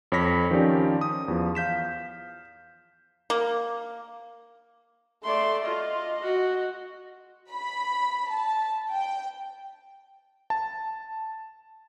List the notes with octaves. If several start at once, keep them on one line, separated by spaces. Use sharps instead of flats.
F2 C#5 B5 A#6 B6
D#3 F3 C#4 G4 D5
D#6
E2 F3
F5 G6 B6 E7
A#3
A3 D5 C6
F4 D#5
F#4
B5
A5
G5
A5